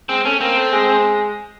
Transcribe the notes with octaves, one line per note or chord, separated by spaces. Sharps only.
G#3 C4
A3 C#4
A#3 C4
A3
G#3